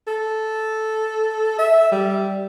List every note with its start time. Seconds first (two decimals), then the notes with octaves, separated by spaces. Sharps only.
0.07 A4
1.59 E5
1.92 G3